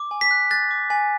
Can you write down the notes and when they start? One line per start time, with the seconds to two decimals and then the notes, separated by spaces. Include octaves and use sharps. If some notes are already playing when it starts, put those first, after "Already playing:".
Already playing: D6
0.11 G#5
0.21 B6
0.31 F#6
0.51 F#6 A6
0.71 D6
0.90 G#5